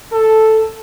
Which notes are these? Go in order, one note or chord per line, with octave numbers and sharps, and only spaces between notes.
A4